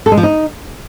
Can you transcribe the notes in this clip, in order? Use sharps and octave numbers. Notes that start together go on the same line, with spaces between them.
A4
G#3
F3
D#4